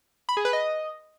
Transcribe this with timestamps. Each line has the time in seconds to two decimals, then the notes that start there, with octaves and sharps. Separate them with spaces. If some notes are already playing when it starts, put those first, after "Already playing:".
0.29 B5
0.37 G#4
0.45 B4
0.53 D#5